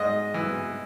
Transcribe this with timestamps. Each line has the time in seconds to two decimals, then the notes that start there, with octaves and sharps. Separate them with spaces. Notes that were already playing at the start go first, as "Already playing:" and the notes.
Already playing: G#2 D#5
0.34 E3